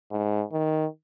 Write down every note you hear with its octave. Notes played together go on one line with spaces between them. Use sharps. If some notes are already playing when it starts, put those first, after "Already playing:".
G#2
D#3